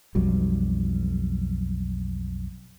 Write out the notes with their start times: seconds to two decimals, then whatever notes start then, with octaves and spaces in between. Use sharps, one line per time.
0.15 B1 F2 F#3 G3